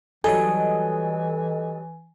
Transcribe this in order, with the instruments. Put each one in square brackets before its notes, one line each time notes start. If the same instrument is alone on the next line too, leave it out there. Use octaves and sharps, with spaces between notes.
[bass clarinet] E3 [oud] F#3 G3 D#4 [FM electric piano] A4 D#5 [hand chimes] G#5